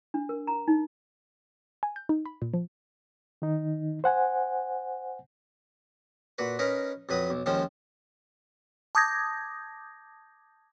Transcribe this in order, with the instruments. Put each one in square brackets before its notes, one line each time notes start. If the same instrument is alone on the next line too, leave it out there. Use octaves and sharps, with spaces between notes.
[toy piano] D4
A#4
A#5
D#4
[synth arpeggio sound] G#5
G6
D#4
B5
A#2
F3
[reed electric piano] D#3 D#4
C5 F#5 G#5
[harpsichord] A#2 F#4 B4
C#4 D#4 A#4 B4
F2 F#3 B4 D#6
B1
D#2 D#3 F3 G#3 C#4
[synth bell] A5 D6 D#6 G6 G#6 A#6